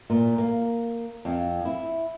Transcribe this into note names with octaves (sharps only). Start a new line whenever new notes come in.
A#2
A#3
F2
E4